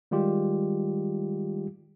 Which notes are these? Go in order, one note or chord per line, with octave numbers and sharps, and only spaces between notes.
D#3 G3 G#3 F4 G4